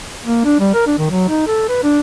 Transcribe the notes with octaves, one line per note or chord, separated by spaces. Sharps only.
A#3
D4
G3
A#4
D4
D#3
F#3
D#4
A4
B4
D4